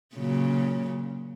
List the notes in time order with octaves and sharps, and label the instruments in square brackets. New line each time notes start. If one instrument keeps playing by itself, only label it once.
[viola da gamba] A#2 C#3 F#3